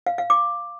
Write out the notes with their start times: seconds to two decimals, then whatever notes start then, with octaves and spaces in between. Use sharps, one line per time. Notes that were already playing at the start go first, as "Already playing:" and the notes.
0.07 F5
0.18 F5
0.30 D6